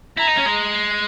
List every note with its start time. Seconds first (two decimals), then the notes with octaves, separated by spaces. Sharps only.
0.17 E4 A#5
0.27 D#4
0.37 C#4
0.46 G#3